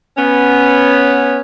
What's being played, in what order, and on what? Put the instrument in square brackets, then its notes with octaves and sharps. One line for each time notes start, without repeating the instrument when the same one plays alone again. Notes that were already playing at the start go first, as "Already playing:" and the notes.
[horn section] B3 C#4